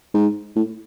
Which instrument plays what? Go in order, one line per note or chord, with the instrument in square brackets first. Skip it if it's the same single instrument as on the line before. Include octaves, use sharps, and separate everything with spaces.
[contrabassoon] G#2
A2